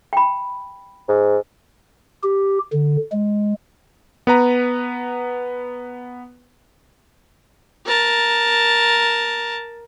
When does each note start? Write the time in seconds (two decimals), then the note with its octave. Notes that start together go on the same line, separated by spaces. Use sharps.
0.13 G5 B5
1.08 G#2
2.23 G4
2.73 D3
3.12 G#3
4.27 B3 B4 A#5
7.86 A#4 A5